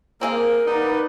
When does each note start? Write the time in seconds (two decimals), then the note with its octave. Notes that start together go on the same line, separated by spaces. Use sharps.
0.21 A#3 C4 G#4 A#4 F5
0.66 D#4 B4 D5 F#5